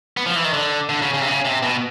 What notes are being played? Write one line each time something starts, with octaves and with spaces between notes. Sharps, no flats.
B3
F3
E3
D#3
D3
D3
C#3
C#3
C3
C#3
C3
B2